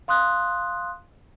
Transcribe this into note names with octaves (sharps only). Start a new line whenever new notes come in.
F5 C6 D#6 F#6